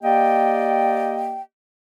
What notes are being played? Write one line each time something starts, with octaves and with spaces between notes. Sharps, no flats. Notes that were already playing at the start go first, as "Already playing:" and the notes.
A#3 G4 D5 D#5 G5